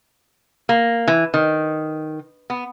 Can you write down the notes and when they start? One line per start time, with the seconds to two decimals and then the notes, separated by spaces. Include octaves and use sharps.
0.69 A#3
1.08 E3
1.34 D#3
2.50 B3